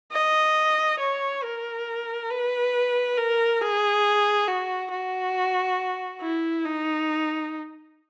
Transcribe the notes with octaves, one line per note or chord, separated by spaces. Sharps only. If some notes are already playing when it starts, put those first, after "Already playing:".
D#5
C#5
A#4
B4
A#4
G#4
F#4
F#4
E4
D#4